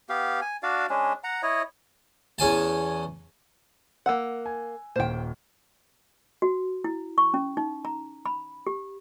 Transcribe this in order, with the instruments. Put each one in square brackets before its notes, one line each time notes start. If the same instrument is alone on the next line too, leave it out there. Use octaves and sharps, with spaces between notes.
[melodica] B3 G4 F5
G#5
D4 F#4 D5 F5
G#3 C#4 D4
F#5 A#5
E4 C#5 D#5
[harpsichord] E2 C#4 G#5 A5
[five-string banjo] A#3 F#5 [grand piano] E6 F#6
[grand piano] G#5
[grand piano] D#1 A#2 [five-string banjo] C5 G5
[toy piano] F#4
E4
C#6
C#4
D#4
A#5
B5
G4